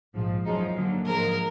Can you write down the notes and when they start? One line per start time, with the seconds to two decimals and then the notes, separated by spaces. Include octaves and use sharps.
0.15 A#1 G#2 F3
0.45 F#2 F3 G#3 D#4
0.76 F#2 D3 F#3 A#3
1.06 G#2 F3 G#3 A#4